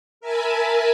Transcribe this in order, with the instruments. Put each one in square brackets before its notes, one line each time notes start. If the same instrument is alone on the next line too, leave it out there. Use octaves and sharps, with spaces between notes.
[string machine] A#4 E5 G#5 A5 B5